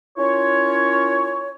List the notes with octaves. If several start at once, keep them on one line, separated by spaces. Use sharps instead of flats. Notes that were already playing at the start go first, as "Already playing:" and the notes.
C#4 E4 F4 A#4 C#5